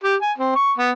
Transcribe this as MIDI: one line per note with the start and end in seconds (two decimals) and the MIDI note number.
0.03 0.15 67
0.22 0.32 80
0.38 0.54 60
0.55 0.72 85
0.78 0.90 59